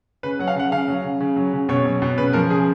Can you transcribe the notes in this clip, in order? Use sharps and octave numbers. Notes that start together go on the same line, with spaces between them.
C#3 B4
F#3 F#5
F5
C#3 F#5
C#3 F5
F#3
C#3
C#3
F#3
C#3
B2 C#5
F#3
B2
C#3 B4
F3 A#4
C#3 G#4